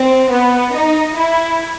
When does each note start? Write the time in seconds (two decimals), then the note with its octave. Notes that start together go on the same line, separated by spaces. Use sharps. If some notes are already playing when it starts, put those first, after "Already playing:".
Already playing: C4
0.32 B3
0.76 D#4
1.18 E4